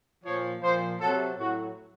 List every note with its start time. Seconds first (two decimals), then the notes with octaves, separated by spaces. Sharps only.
0.25 A#2 F3 C#5
0.63 A#2 F3 C5
1.00 C3 F#3 A4
1.38 A2 F#3 F#4